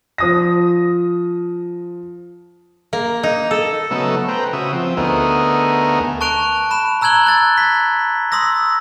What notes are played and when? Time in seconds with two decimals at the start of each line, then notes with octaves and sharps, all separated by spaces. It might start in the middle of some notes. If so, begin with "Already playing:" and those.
0.18 F3 D#6 A#6
2.93 A#3
3.23 D#4
3.51 A4
3.91 C#3 F#3 A3 B3 D#4 A4
4.28 B4 C5 G5 A#5
4.53 C#3 F#4 E5 D#6
4.73 F3 C4
4.97 D2 A3 B3 D#4 G#4 A#4
6.21 A5 C#6 F#6 D7 F7
6.71 B5 E7
7.01 A#5 E6 F#6 G#6 F#7 G7
7.26 F#6 A6
7.58 B6
8.32 C6 D#6 E6 A#6